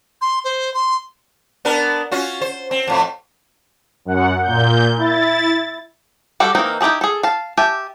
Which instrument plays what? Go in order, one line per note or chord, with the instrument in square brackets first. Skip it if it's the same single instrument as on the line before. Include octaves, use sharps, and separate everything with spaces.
[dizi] C6
C5
C6
[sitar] B3 D4 A#4
C#4 F4 F#4
C5
C4
F2 A2 F3
[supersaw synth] F#2 F#5
A#2 G6
E4 A6
[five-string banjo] G3 F#4 A4 D5
E3 A#3 C4 D#4 A#4
D#4 E4 G4 G#4 A5
G#4 A4
F5 A5
G4 E5 G#5 A5